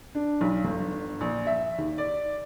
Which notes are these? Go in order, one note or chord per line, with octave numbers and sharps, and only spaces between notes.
D4
B1
G1
A#1
E5
D#2
D5